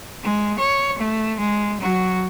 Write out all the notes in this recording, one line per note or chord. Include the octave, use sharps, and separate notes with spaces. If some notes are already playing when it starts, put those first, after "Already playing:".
G#3
C#5
A3
G#3
F#3 F#4